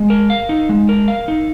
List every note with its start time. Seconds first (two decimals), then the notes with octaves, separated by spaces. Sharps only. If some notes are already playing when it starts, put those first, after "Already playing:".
Already playing: G#3
0.10 A#4
0.30 F5
0.49 D#4
0.69 G#3
0.89 A#4
1.08 F5
1.28 D#4